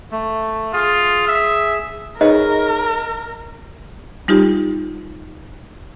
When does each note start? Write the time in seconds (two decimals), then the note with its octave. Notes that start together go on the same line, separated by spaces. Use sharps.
0.11 A3
0.74 F4 G#4
1.27 E5
2.21 D#4 G#4 A#4 B4 C#5 D#5
4.28 G3 D#4 F4 G4